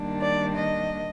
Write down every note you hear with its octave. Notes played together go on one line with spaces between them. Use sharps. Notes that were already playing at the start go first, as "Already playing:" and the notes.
Already playing: D#3 G3 A#3 D4
D5
D#5